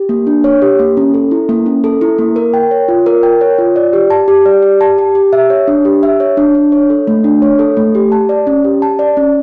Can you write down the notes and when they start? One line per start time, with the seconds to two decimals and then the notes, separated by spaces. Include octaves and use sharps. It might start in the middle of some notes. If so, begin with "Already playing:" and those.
Already playing: G4
0.09 A#3
0.27 D4
0.44 C#5
0.62 G4
0.79 A#3
0.97 C#4
1.14 A4
1.31 E4
1.49 A#3
1.66 C#4
1.84 A4
2.01 E4
2.18 A#3
2.36 A#4
2.54 G5
2.71 C#5
2.88 F4
3.06 A#4
3.23 G5
3.41 C#5
3.58 F4
3.76 D5
3.93 G4
4.10 A5
4.28 G4
4.46 D5
4.63 G4
4.81 A5
4.98 G4
5.15 G4
5.33 E5
5.50 C#5
5.68 D4
5.85 G4
6.03 E5
6.20 C#5
6.37 D4
6.55 D4
6.72 C#5
6.90 A4
7.07 A3
7.24 D4
7.42 C#5
7.59 A4
7.77 A3
7.95 G4
8.12 A5
8.29 D5
8.47 C#4
8.64 G4
8.82 A5
8.99 D5
9.17 C#4